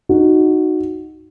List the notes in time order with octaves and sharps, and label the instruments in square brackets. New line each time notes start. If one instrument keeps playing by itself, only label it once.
[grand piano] D#4 F#4